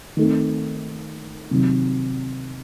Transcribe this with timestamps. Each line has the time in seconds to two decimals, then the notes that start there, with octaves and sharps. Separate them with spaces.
0.17 D#3 A3 C4
1.51 C3 D#3 F#3